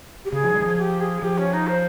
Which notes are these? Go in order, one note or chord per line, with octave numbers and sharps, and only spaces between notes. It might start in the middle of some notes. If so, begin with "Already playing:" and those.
G4
C#3 G#4
F3
G3
D#3
F3
G4
G#4
F3 G4
C#4
D#4
C5